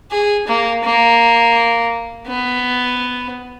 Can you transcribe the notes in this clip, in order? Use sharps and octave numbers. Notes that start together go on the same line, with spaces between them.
G#4
A#3
A#3
B3